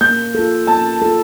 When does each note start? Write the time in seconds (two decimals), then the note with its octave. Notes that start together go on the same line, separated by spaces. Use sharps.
0.01 A#3 G6
0.35 F4 A4
0.67 A#3 A5
1.02 F4 A4